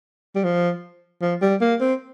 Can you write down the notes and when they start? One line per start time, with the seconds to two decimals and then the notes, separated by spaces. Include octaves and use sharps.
0.35 G3
0.44 F3
1.21 F3
1.42 G3
1.61 A#3
1.80 C4